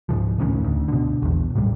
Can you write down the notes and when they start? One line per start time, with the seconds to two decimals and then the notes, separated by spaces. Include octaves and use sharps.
0.09 C#2 G#2 C#3 F3
0.39 F1 A2 D#3 C#4
0.64 D2
0.88 B2 D3
1.22 A#1 E2
1.55 A2 C#3 F#3 G3